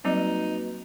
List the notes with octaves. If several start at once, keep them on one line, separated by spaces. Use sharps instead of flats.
F#3 G3 A#3 C4 D#4 F#4 B4